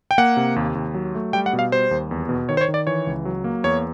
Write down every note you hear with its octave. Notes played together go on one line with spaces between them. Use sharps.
G5
A#3 F#5
C3
D#2
D#2
F#3
A3
G3 G5
F#5
B2
F5
G3 C5
D#2
E2
B2
D#3 C#5
C5
C#5
D#3
D5
E3 C#5
C#2
F#3
A#3
E2 C#5